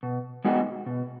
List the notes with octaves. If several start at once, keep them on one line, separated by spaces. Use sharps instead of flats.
B2
G#3 B3 D#4 F#4
B2